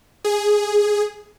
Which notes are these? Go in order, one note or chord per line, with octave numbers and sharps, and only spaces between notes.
G#4